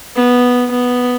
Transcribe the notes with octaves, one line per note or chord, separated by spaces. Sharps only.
B3
B3